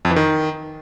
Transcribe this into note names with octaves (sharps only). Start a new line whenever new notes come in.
F2
E3
D#3